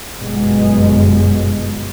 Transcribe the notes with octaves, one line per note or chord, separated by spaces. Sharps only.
G1 F#2 B2 G#3